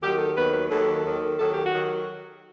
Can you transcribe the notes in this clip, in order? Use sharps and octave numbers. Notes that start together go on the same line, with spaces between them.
D#2 D#3 F#3 G4
A4
D#2 D#3 F#3 B4
B4
D#2 D#3 F#3 A4
D#2 D#3 F#3
D#2 D#3 F#3 A4
G4
F#4
D#3 F#3